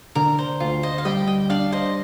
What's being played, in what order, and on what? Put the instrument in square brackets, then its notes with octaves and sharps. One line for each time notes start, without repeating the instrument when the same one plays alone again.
[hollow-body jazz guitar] D3 [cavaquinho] A#4
[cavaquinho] C5
[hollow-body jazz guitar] D2 [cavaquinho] F4
[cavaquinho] C5 D#5
F5
[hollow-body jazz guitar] G3 [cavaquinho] D#5 G5
[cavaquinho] D#5 G5
[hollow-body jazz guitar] D4 [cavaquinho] D5 F5
[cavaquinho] C5 D#5